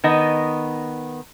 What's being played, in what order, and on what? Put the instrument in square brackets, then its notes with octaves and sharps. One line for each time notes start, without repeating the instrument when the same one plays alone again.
[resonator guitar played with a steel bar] D#3 B3 D#5